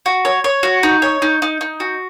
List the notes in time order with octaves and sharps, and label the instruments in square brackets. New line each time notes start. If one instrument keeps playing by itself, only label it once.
[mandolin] F#4
C#5
C#5
F#4
D#4
C#5
D#4
D#4
D#4
F#4